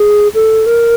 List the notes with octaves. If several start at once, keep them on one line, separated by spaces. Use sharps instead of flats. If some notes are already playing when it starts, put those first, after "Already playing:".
Already playing: G#4
A4
A#4